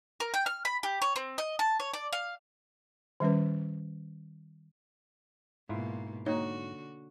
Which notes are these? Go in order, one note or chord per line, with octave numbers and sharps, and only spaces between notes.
A#4
G5
F6
B5
G4
C#5
C4
D#5
A5
C#5
D5
F5
D#3 G3 C#4 B4
G#2 B2 A#3 E4 F4
D3 A#3 D#4 F#4 C#5